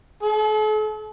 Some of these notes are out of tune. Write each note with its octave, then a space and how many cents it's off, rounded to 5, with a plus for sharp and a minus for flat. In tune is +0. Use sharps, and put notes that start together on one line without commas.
A4 -45